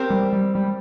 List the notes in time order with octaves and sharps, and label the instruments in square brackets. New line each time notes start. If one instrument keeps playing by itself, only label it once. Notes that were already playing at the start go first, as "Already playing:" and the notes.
Already playing: [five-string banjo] C4 G4 A#4
[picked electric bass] G3
G3
G3